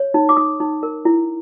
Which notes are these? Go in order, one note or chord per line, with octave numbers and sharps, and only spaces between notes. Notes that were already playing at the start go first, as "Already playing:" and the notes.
Already playing: C#5
D#4
D6
D#4 D#6
D#4
A#4
E4